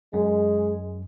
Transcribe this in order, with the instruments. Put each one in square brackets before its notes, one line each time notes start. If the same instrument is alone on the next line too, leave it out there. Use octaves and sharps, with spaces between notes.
[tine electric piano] F#2 [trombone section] G#3